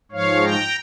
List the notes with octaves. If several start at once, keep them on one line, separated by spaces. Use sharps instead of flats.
G#2 F3 C#5 F5
G5 A#5